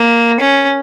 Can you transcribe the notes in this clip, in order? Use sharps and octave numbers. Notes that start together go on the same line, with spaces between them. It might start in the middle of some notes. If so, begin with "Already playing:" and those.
Already playing: A#3
C#4